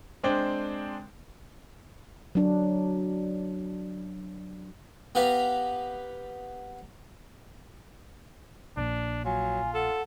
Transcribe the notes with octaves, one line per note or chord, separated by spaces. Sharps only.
G#3 C4 D4 C5 G5
F#3 D4
B3 G4 B4 F5 A#5
A#1 A#2 D4
F#3 F4 G#5
A4 F#5